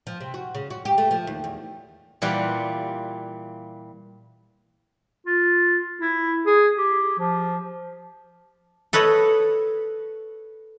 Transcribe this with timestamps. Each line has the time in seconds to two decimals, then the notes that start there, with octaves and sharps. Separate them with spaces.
0.07 F3
0.20 C3
0.34 F#4
0.55 C#3
0.70 F#4
0.85 G4
0.98 A3
1.11 F3
1.27 D#2
1.44 E2
2.22 A#2 E3 G3 F4 F#5
5.26 F4
6.01 E4
6.46 G#4
6.78 G4
7.19 F3
8.93 A4 B4 C#5 D#5